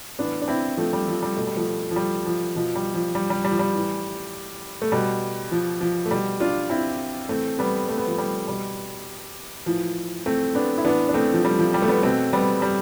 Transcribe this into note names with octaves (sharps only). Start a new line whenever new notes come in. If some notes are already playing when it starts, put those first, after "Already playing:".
A2 E3 B3 D4
D4
C4 E4
F3 A3
G3
F3
G3
B2 A3
G3
F3 A3
F3
G3
F3
B2 F3
G3
F3
G3
G3
G3
F3
G3
A2 E3
A3
B2 G3
F3
F3
A3
B2 G3
D4 F4
C4 E4
A2 E3 A3 C4
G3 B3
A3
B3
F3 A3
G3
B2 G3
A2 E3 F3
A3 C4
B3 D4
E4
A2 E3 B3 D4
D4
A3 C4
F3
G3
F3
G3
A3
G3 B3
B2 A3 C4
G3 B3
G3